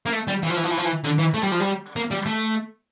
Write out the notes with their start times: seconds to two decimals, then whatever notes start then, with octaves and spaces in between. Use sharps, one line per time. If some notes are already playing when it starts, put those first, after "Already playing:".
0.06 A#3
0.13 A3
0.28 G3
0.43 E3
0.50 F3
0.57 E3
0.64 F3
0.71 E3
0.78 F3
0.85 E3
1.04 D3
1.19 E3
1.34 A3
1.43 G3
1.52 F3
1.60 G3
1.96 A#3
2.11 G3
2.26 A3